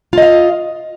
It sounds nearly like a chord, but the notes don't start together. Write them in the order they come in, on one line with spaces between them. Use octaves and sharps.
F4 D#5 F5